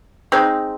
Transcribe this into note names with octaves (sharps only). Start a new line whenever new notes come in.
G#3 C4 D#4